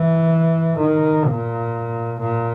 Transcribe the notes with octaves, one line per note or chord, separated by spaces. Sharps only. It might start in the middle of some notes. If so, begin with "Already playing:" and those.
Already playing: E3
D#3
A#2
A#2